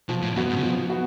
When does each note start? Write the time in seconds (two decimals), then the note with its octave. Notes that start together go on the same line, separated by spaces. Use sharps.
0.09 B2 F3
0.22 A2
0.36 F#2 B3 F#4
0.49 G#2
0.56 C#3
0.63 B2 F3
0.90 B3 F#4